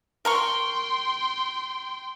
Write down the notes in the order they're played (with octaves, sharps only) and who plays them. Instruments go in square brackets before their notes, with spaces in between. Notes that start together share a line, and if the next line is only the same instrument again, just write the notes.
[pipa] A#4 A#5 C#6 [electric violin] G5 C6